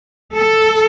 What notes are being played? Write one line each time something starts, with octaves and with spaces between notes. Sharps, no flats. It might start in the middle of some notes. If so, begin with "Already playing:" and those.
A4